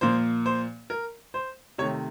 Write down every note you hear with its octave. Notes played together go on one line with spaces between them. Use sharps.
A#2 F3 A#3 C5
C5
A#4
C5
C3 D#3 A3 C#5